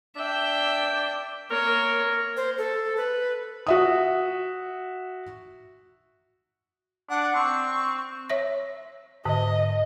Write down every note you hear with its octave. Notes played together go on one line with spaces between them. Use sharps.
D4 E5 G5
A#3 A#4 C#5
C5
A4
B4
F#4 E5 D#6
D4 F#5
C4 C#6
C#5 E5 A#6
G#2 D3 D#5